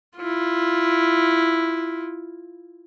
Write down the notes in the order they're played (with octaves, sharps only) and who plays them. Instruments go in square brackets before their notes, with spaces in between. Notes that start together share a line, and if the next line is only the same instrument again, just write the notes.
[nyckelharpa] E4 F4